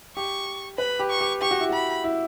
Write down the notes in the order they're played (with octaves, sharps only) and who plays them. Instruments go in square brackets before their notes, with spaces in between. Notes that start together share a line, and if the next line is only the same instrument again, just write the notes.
[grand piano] G4 [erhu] C#6
[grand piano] B4 [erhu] B5
[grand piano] G4
[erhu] C#6
[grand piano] G4
[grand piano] G4 [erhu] C#6
[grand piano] F#4
E4
[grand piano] F#4 [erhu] B5
[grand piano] E4